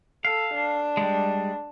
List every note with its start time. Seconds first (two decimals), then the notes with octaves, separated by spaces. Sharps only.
0.25 A4 F5
0.54 D4
0.97 G3 G#3